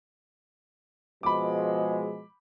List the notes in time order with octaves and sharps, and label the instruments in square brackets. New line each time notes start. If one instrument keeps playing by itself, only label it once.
[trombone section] B2 F3 G#3 [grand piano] B5 D6